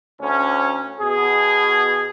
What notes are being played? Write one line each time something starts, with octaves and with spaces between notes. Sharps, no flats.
D2 C#4
B2 G#4